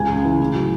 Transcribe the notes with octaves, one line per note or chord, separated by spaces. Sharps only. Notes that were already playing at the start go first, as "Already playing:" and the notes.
Already playing: C#2 G#5
C#3
E3
A2
F#3